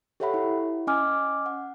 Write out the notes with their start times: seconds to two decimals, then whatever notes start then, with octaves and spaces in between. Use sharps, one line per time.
0.20 G4 A4 C#5 E5 F#5 B5
0.34 E4
0.87 C#4 D#5 G#5 D6 F6
1.46 F#5